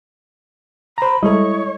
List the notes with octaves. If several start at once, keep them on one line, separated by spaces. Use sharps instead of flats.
C5 A#5 B5
G3 G#3 E4 A4 C#5 D#5